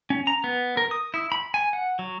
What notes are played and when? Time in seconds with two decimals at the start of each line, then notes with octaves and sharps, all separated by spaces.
0.10 C#4
0.27 A#5
0.44 B3
0.77 A#4
0.91 D#6
1.14 E4
1.32 B5
1.54 G#5
1.73 F#5
1.99 F#3